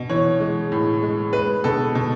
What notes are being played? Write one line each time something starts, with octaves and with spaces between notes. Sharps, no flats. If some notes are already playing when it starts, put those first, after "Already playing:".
Already playing: B2
E3 C#5
G#3
A2
G#3
G#3 B4
B2 A4
B2